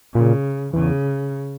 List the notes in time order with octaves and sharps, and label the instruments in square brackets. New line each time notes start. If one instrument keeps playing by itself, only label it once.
[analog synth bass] A#2 [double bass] C#3
[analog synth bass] E2 [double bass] C#3